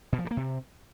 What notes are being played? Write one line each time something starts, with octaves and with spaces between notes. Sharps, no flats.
B2
F3
G2
A#3
C3